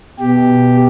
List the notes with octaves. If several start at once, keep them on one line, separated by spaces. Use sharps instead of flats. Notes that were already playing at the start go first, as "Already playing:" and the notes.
B2 G4